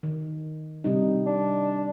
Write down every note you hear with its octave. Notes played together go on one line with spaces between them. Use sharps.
D#3
C3 G3 D#4
D4